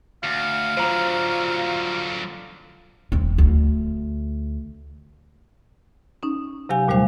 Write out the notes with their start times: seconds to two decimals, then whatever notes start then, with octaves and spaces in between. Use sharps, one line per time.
0.23 D2 F5
0.77 D3 F#3 F4 C5 A#5
3.12 D#1 C4
3.38 D2
6.23 C#4 D#4
6.69 C3 F#3 G4 F5 G#5
6.88 D#2 A#2 G3 A3 C5 F5